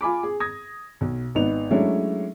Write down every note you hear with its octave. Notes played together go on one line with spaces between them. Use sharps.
F4 G#5 B5 D6
G#4
D#6 G#6 A#6
B1
G#1 D#3 B3 D#4 F7
F#3 G#3 A3 C#4 D4 E4